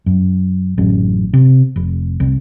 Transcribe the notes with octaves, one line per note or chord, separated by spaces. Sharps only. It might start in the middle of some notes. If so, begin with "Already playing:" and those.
F#2
A1 F#2
C3
F1
C2